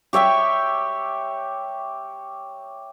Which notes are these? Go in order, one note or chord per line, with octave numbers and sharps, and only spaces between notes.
G4 C#5 E5 G5